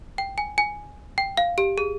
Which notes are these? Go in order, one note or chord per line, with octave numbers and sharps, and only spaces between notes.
G5
G#5
G#5
G5
F5
G4
G#4